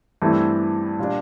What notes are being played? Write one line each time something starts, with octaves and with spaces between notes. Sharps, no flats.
G2 E3 A3 C4 E4
A#2 G3 D4